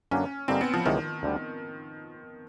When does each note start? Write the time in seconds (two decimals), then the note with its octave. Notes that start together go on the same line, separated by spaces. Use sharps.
0.11 F#2 D3 F#3 A#3 C#4 D4
0.48 G2 D3 G3 A#3 C4 D#4
0.61 B3
0.73 F3
0.86 C#2 C3 D#3 E3 G#3 B3
1.23 D2 D3 G3